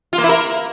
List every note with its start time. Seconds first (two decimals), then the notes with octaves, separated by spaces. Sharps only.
0.13 F4
0.18 A#3
0.24 E4
0.29 A#4